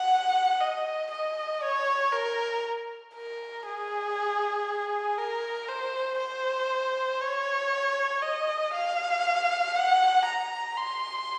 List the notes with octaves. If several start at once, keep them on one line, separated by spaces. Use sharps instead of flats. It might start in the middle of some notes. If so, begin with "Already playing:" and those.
Already playing: F#5
D#5
D#5
C#5
A#4
A#4
G#4
A#4
C5
C5
C#5
D#5
F5
F#5
A#5
C6